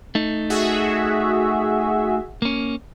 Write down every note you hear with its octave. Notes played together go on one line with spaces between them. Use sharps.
A3 D#4
F#4 G#4 E5
A#3 C#4